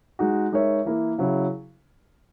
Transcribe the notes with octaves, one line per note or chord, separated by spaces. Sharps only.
G#3 D#4 F#4
G#3 D#4 A#4 C#5 E5
E3 A#3 E4 A#4
C#3 F#3 C#4 E4